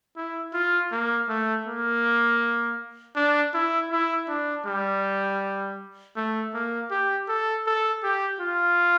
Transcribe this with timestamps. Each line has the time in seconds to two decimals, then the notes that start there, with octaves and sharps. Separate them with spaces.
0.17 E4
0.54 F4
0.91 A#3
1.29 A3
1.66 A#3
3.16 D4
3.54 E4
3.91 E4
4.28 D4
4.66 G3
6.16 A3
6.54 A#3
6.91 G4
7.28 A4
7.66 A4
8.03 G4
8.41 F4